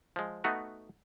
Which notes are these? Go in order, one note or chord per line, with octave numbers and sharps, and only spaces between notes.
F3 G#3
A3 B3 D#4 F#4